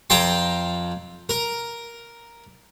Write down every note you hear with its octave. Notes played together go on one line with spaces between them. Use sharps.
F2 G5 A5 A#5 C6
A#4